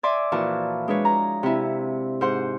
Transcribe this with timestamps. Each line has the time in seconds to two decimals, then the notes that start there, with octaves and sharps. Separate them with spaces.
0.03 D5 E5 G#5 C6 D6
0.32 A#2 E3 F3 F#4 A5
0.88 G#3 D4 B4 C#5
1.05 A#5
1.43 C3 E4
2.21 G#2 C5 F#5 C6